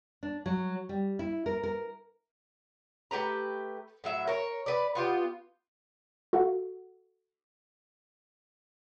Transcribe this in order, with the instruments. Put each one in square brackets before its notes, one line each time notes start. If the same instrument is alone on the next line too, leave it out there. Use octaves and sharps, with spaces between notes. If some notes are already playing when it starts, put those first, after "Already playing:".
[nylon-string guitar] D4
F#3
G3
E4
A#4
A#4
[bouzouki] A3 G4 B4 A#5
A2 F#3 E5
A#4 C#5
B4 D5
B3 F4 G4
[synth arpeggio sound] F#4 A4 F5 F#5